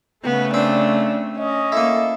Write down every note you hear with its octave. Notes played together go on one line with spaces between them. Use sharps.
C#3 A3 B3
C4 D4
C#4 D#5
A#3 E4 A4